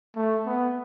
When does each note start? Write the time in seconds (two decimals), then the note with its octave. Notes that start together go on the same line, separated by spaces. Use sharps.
0.16 A3
0.46 B3